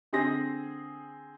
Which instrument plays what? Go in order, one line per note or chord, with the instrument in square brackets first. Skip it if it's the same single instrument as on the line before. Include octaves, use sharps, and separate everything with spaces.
[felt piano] D3 C4 G#4 C6 A#6